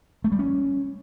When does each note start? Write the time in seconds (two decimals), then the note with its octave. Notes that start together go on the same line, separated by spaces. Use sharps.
0.24 A3
0.32 G3
0.39 C#4